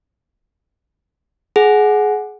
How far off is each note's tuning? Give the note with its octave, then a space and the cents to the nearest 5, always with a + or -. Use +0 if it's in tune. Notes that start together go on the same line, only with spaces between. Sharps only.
G#4 +20 F#5 +0